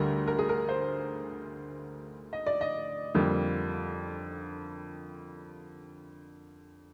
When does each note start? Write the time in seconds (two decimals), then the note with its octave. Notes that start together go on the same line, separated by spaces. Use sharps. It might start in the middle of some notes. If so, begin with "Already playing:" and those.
Already playing: D2 D3 G3 A#4
0.27 A#4
0.39 G#4
0.49 A#4
0.69 C5
2.33 D#5
2.46 D5
2.61 D#5
3.14 F2 D3 G3 A#3